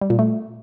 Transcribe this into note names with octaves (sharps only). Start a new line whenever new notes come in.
G3
A#2
A3